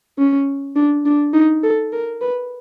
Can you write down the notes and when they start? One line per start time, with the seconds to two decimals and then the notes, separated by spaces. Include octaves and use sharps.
0.19 C#4
0.76 D4
1.06 D4
1.34 D#4
1.64 A4
1.93 A#4
2.21 B4